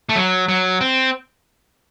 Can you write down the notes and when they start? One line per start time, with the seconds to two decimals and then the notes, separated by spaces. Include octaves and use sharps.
0.09 A3
0.16 F#3
0.49 F#3
0.81 C4